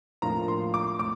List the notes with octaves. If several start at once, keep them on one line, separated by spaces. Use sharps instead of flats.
A2 F3 A#3 D4 F4 A#5
C6
D6
A2 D6